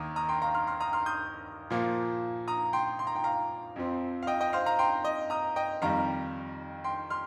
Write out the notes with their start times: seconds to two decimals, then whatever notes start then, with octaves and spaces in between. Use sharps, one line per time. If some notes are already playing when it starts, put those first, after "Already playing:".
Already playing: D#2 D#3 A#3 A#5 D#6
0.16 A#5 D#6
0.29 G5 C6
0.42 F5 A#5
0.54 C6 F6
0.67 C6 F6
0.80 A#5 D#6
0.93 C6 F6
1.06 D#6 G6
1.70 A#2 F3 A#3
2.48 A#5 D#6
2.73 G5 C6
2.99 C6
3.07 A#5
3.16 G5
3.24 F5 A#5
3.76 F2 F3 C4
4.23 F5
4.27 D#5 G5
4.41 D#5 G5
4.53 C5 F5
4.66 F5 A#5
4.79 G5 C6
5.05 D#5
5.30 A#5 D#6
5.56 D#5 G5
5.82 F2 D#3 G3 F5 A#5
6.84 G5 C6
7.10 C6 F6